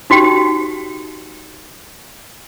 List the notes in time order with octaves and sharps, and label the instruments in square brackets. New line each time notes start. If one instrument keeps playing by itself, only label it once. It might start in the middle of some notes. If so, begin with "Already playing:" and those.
[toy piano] D#4 F#4 G4 G5